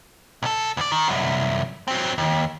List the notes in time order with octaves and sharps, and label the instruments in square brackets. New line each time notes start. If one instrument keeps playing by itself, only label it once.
[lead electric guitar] B1 A4
D2 D5
D#3
C2 F#2
F#3 C4
D#2